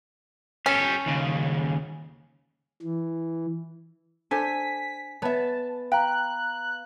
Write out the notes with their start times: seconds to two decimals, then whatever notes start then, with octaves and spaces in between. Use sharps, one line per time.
0.66 C#4 G4 A4
1.07 D#2 C#3
2.82 E3
4.31 D4 A4 C5 G#5 B6
5.22 B3 C#5 E5 A5
5.92 F5 G5 A#5 F#6